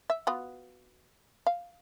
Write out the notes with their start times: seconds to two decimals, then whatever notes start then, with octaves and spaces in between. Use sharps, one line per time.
0.10 E5
0.27 B3 F4 F#4
1.47 F5